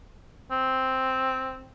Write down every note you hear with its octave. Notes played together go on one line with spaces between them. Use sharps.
C4